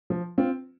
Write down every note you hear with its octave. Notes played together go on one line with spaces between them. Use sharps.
F3
C4 F4